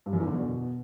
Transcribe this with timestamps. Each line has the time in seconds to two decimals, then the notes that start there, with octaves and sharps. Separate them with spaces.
0.06 G2
0.13 F#2
0.20 E2
0.27 D3
0.34 B2